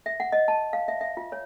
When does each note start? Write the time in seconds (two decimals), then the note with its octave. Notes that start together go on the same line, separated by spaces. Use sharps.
0.06 E5
0.20 F#5
0.32 D#5
0.48 A5
0.73 F5
0.88 E5
1.01 E5
1.17 F4
1.32 C#5